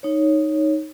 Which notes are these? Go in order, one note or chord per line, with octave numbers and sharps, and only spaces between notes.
D#4 C#5